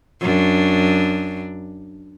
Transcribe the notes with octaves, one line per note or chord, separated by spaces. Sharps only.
F#2 D4